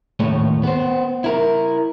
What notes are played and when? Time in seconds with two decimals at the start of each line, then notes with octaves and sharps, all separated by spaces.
0.20 D#2 A2 A3 C#5
0.63 B3 C5
1.24 E4 A#4